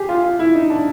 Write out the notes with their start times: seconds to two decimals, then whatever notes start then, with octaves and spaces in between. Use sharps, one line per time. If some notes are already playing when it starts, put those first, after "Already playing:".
Already playing: G4 G#4
0.09 F4
0.24 F4
0.39 E4
0.55 D#4
0.70 D4